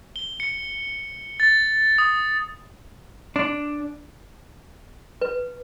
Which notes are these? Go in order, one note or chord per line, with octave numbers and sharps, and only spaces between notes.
G7
C#7
A6
D#6
D4
B4